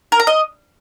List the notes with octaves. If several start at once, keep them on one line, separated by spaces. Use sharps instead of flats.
A#4
A#5
D#5